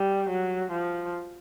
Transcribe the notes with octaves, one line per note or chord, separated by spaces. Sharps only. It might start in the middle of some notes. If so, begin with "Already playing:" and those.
Already playing: G3
F#3
F3